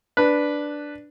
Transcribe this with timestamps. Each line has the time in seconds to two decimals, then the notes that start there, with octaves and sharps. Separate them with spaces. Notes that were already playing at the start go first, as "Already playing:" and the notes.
0.17 D4 B4